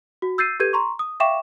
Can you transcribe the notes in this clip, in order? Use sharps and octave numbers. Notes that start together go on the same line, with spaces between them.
F#4
E6 G6 A6 C7 D#7
G4 A4 B4 G6 G#6 D#7
A#5 C6 C#6
D#6
E5 F5 G5 C#6 D6 E7